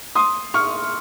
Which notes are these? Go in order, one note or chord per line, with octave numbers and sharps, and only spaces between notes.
C6 D#6
C#6 F6